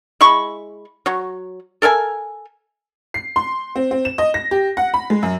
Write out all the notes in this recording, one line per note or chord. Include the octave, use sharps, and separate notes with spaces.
G#3 E4 B5 C#6
F#3 C#5
A4 A#4 E5 G#5
C7
C6
C4
C4
E7
D#5
A#6
G4
F#5
B5
G#3
F#2